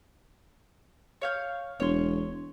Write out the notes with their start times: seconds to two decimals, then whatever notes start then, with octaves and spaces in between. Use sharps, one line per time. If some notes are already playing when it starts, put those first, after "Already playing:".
1.21 C#5 F5 G6
1.80 E1 C#5 C6